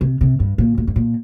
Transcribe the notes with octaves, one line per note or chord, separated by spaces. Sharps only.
C3
C3
G2
A#2
A#2
G2
A#2